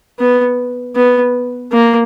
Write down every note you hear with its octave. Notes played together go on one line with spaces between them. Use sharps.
B3
B3
A#3